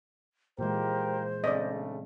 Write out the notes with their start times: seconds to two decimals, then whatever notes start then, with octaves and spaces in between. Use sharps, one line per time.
0.59 A#2 E3 G#3 F4 G4 A#4 C5
1.44 C#3 A3 C4 D4 D5 D#5